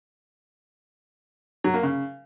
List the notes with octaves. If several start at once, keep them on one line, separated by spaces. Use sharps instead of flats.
F#3
A#3
C#3